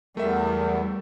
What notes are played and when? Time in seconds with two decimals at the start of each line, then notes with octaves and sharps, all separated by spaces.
0.17 E2 G3 A3 A#4 E5